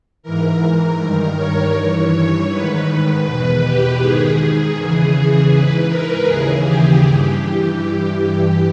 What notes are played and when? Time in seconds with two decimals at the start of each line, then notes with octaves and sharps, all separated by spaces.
0.23 G#2 E3 A#4
0.98 G2 D#3
1.36 C#5
1.74 G2 E3
2.11 C#5
2.49 G#2 D#3 B4
3.24 E2 B2 B4
3.62 G4
4.00 G#2 D#3 G#4
4.75 E2 C#3 E3
5.51 G#2 E3 B4
5.89 A#4
6.25 D#2 C#3 E3 G#4
6.63 G4
7.01 G2 E3 G4
7.39 G4
7.77 G2 E3